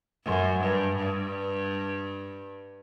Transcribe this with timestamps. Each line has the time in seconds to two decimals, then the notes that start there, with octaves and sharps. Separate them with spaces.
0.25 F#2
0.60 G2
0.96 G2